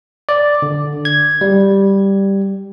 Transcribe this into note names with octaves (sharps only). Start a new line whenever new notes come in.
D5
D3
G#6
G3